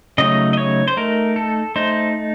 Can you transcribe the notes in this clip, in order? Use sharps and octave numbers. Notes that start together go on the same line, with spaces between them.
C#3 F#3 A3 D#4 D#5
D#5
C#5
C5
A3 D#4 A#4
A4
A3 D#4 C5